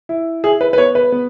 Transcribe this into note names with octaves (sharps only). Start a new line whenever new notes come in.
E4
E4 G#4
B4
B4
B3 C#5
B4
B3